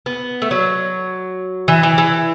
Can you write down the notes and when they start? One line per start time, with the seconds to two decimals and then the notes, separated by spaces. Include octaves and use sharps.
0.06 B3
0.42 A3
0.51 F#3
1.68 E3
1.83 E3
1.98 E3